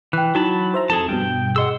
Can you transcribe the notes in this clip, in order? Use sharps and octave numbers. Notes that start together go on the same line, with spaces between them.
E3 G5 F#6
F#3 D#4 E4 F#4 A5 B5
C5 E5 A#5
F2 G#4 A4 A5
G2 B2 G5
G#4 D#5 F#5 C6 E6